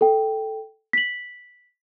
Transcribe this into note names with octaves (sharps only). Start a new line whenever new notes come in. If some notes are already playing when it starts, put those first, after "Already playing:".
A4 G5
B6 F#7